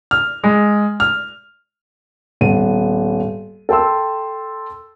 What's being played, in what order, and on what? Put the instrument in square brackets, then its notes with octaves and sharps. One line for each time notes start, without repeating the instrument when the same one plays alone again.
[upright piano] F6
G#3
F6
[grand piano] D#1 B3 D#7
A4 G5 C6 E6